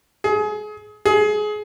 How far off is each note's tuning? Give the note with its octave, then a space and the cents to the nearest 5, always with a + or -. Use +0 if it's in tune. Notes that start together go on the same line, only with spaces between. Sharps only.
G#4 +30
G#4 +25